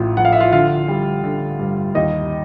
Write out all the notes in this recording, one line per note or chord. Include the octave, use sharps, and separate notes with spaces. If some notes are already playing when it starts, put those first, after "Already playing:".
Already playing: A1 A2 F4
F3 F#5
F5
E5
F4 F5
D3 F4 F5
G3
D3
G2
D#2 D#4 D#5